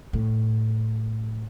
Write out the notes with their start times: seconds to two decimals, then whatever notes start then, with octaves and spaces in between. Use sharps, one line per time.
0.13 A2